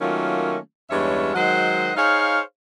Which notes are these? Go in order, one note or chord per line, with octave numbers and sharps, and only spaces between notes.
D#3 F#3 A3 A#3 C#4 F4
E2 G2 G#3 C#4 C#5 E5
D#3 F#3 G#3 C5 D#5 F#5
D#4 G#4 C5 C#5 F5